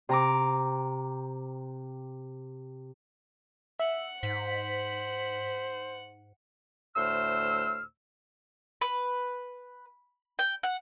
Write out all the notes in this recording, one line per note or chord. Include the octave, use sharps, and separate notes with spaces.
C3 A#5 D6
E5 F#5 F#6
G#2 C5 B6
D2 A2 A3 C5 E6 F6
B4
G5
F#5